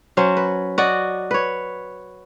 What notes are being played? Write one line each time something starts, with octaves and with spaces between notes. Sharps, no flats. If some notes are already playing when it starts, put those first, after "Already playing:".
F#3 C#4 C5
B4
F#4 D5 D#5
B4 C#5